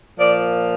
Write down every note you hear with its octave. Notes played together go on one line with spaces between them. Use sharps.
A#2 F3 D5